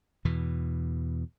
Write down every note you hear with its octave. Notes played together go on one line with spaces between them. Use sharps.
E2 B2 E3